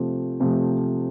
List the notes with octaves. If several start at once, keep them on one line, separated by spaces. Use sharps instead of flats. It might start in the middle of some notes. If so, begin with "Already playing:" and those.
Already playing: C3 F3 A3
C3 F3 A3